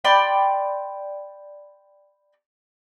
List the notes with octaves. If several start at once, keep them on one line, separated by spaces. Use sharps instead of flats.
D5 G5 B5 C6